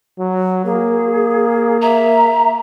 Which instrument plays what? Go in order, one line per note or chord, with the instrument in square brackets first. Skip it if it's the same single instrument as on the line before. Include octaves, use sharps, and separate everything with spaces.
[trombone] F#3
[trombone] A#3 [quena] G#4
[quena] E5 [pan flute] A#5